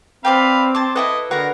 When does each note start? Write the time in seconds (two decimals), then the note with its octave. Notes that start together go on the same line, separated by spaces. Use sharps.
0.25 C4 B4 C5 D5 F5 G5
0.75 C5 A5 C6 D6 G#6 A6
0.96 E4 F#4 A4 B4 D#5
1.31 D3 F#4 A#4 B4 C#5 F#5